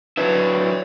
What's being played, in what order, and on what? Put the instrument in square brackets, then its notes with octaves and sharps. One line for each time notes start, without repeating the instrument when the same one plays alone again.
[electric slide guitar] F#3 D4 E4 [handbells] B4 [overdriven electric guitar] C#5 E5